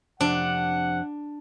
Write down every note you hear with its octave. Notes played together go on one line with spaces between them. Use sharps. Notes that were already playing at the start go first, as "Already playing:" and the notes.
F2 C3 C4 D4 F#5